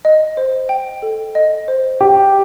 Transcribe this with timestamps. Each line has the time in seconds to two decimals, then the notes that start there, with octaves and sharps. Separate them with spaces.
0.05 D#5
0.37 C5
0.69 G5
1.02 A4
1.35 D#5
1.68 C5
2.01 G4 G5